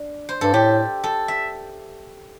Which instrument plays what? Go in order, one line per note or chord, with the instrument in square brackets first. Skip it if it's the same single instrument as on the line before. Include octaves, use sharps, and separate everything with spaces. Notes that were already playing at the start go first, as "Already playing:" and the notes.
Already playing: [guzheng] D4
C5
[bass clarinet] G2 [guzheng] A4
[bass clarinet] A2 [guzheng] G4
[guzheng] A4
E5